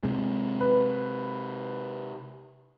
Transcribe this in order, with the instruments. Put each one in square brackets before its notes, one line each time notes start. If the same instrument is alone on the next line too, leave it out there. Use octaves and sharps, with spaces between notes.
[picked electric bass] C3 G#3
[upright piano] B4